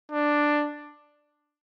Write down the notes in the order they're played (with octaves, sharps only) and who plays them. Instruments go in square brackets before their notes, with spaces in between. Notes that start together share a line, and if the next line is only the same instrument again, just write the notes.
[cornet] D4